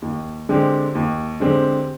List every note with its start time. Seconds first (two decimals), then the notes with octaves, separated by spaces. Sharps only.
0.02 D#2
0.49 D3 G#3 C4 G4
0.95 D#2
1.40 D3 G#3 C4 G4